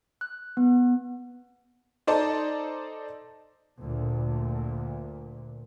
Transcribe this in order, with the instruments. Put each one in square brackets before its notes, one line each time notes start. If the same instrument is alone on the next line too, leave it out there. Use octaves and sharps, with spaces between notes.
[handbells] F#6
B3
[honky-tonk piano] D#4 A4 C5 D5 D#5 A5
[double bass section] D2 A#2